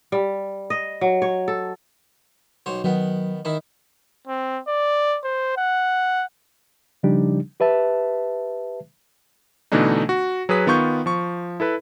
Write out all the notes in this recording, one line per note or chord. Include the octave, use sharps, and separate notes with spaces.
G3
D#5
F#3
C#5
A4
B1 C5 C#5
D#3 F#3 B3
D#3 D#4 E4
C4
D5
C5
F#5
C#3 F3 G3 D4 D#4 G4
G4 B4 E5 A5
B2 D3 E3 A3 D4 D#4
F#4
F#3 G#4 B4 D#6 B6
D#3 B3 F4 C#6 G6
F3 C#6
E4 A4 B4 B5